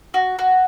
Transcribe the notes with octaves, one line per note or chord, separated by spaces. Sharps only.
F#4
F#4